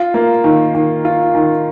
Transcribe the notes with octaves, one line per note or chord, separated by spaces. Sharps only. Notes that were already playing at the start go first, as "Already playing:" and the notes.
Already playing: F4
A#3
D#3
D#3
F4
D#3